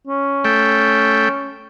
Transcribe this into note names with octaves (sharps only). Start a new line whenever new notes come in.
C#4
A3 G5